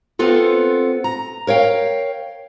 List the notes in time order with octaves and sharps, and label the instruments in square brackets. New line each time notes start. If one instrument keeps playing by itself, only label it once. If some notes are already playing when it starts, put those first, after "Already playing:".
[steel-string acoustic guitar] B3 C4 F4 A4
A#5
A#4 C#5 F5 G5